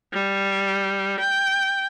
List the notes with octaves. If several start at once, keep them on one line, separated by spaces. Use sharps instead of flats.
G3
G5